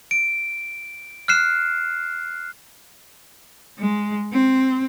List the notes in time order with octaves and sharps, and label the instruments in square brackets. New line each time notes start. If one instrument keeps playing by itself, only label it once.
[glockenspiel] D7
F6 F#6 C7 E7
[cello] G#3
C4